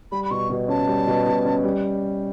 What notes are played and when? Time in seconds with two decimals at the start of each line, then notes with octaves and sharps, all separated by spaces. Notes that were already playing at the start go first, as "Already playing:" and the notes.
0.11 G3 B5
0.25 B5
0.31 B2 C#6
0.50 B2
0.68 C#4 A5
0.88 G3
1.07 B2
1.26 B2
1.45 C#4
1.64 G3